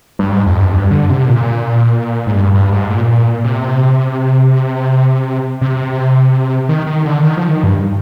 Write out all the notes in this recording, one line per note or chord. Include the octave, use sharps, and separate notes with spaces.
G2
G#2
F2
G2
F2
G2
D3
C3
A#2
G#2
G2
G2
G#2
A#2
C3
C3
D#3
D#3
D3
D#3
F3
D#3
G2